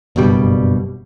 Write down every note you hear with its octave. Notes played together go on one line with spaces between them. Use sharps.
F#1 G2 B2 G3